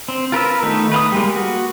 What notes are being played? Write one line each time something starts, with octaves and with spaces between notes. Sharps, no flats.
C4
F4 A#4 B4 E6
D#3 A3 B3 D#4
B4 F5 D#6
G3 G#3 A#3
F#4